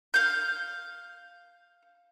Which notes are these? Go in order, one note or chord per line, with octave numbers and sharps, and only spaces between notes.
F5 G6